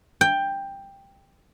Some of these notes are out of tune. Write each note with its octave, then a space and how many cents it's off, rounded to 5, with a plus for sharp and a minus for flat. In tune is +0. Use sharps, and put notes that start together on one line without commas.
G5 +10